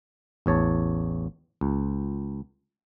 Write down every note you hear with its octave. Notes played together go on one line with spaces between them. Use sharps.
A1 E2 C#5 A5
C#2